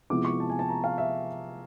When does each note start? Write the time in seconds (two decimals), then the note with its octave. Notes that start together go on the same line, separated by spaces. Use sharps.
0.10 C3 F3 G#3 B3 E4 D6
0.25 C#6
0.40 A5
0.50 G#5
0.59 A5
0.69 A#5
0.84 F5
0.98 E5